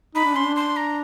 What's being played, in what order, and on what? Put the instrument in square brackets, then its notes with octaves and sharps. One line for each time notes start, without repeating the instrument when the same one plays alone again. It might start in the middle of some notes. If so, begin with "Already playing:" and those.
[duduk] D#4 [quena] B5
[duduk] D4
[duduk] C#4 [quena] C6
[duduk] D4
[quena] C6
A#5